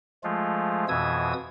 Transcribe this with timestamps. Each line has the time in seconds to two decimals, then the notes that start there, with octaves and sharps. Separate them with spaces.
0.24 F3 G#3 A3 F4
0.89 F2 B2 E3 D#6 E6 G#6